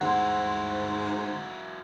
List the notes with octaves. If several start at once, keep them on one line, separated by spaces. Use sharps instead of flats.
G1 D2 G#2 F#3 E4 C5 F#5